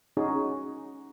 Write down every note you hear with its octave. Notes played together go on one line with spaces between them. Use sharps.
C#4 D#4 F#4 G#4